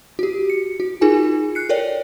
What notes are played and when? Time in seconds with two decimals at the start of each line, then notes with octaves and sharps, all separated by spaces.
0.19 F#4 G4
0.50 C#7
0.80 F#4
1.01 D#4 F4 G#4 A#4 G#5
1.55 F#6 C7 C#7
1.69 A4 A#4 C#5 D5 G5